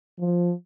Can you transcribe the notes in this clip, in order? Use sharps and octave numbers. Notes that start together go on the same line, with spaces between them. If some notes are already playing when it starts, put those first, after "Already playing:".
F3